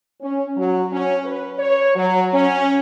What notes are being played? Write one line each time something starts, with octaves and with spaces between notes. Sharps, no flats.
C#4
F#3
C#4
B4
C#5
F#3
C#4